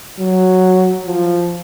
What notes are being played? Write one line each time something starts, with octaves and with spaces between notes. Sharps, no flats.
F#3
F3